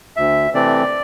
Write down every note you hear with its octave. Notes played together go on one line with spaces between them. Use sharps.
D2 E5
C3 E3 A3 C4 D5